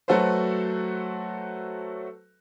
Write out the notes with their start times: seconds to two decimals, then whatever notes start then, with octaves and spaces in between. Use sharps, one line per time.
0.08 F#3 A3 F#4 A4 B4 C5